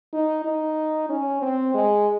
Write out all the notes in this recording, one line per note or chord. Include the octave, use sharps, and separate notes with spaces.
D#4
D#4
C#4
C4
G#3